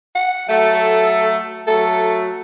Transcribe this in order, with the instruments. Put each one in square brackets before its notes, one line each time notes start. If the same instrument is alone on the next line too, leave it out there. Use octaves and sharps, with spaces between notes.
[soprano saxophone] F#5
[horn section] F#3 A3 [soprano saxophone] A4
[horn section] F#3 A3 [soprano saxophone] A4